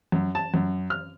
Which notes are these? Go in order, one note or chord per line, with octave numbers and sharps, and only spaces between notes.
F#2
A5
F#2
F6